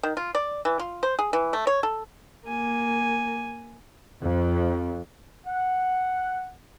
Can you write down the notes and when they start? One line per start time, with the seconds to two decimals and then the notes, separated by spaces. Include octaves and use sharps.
0.03 D#3
0.17 F4
0.35 D5
0.65 E3
0.79 F4
1.03 C5
1.19 G#4
1.33 E3
1.53 A3
1.67 C#5
1.83 A4
2.48 A#3 G#5
4.23 F2
5.45 F#5